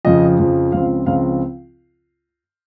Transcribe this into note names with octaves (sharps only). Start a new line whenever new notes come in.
F2 C#3 F3 D#5
F2 C#3 F3
C#2 C#3 F3 C4 F5
C#2 C#3 F3 C4 F5